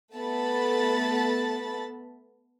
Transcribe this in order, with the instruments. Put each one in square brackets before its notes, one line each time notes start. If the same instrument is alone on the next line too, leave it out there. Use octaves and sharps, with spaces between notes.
[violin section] A3 B3 A4 A5 B5 A6